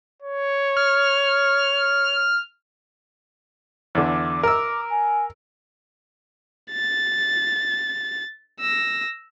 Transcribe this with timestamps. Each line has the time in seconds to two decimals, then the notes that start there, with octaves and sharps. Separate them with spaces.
0.22 C#5
0.77 F6
3.95 E2 D3 D6
4.43 A#4 E6
4.90 G#5
6.72 A6
8.61 E6 A#6